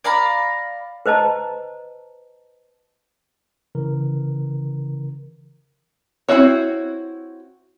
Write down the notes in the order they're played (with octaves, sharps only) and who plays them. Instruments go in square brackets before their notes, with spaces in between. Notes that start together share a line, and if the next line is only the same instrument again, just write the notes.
[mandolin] D5 F5 A#5 B5
[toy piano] B4 C5 D#5 A5 A#5
[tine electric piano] C#3 E3 A#4
[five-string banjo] C4 C#4 E4 F#4 C#5